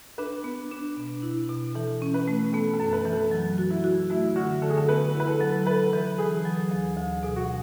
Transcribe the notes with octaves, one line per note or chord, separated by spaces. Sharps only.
D4 B4
B3
D4
B2
E4
B2
E3 A4
C#4
B4
A3
B3 A4
A4
F#2
B4
E3
A4
F#3
F#4
E4
F#4
A3 E4
D3 F#4
D3 A4
G#4
A4
B3 B4
E4
B4
A4
F#3
A4 B4
E3
E3 G#4
F#3
D2
D2
B2 G#4
F#4